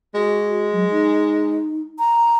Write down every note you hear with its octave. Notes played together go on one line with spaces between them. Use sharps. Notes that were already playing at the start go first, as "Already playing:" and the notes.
G#3 F#4
F#3
D#4
A#5